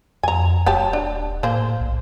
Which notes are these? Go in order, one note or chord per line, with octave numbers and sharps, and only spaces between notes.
F2 G#5 A#5
D#1 F#3 G4 A5
D4
A2 A#3 G#4 C5
B1